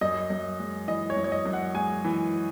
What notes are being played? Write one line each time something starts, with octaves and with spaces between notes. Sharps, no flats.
F#2 D#5
F#2
G#3
E3 D#5
C#5
F#2
C#5
D#5
F#2
F#5
G#3 G#5
E3